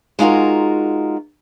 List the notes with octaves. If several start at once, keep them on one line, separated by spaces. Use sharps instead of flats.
G#3 D#4 F4 F#4 A#4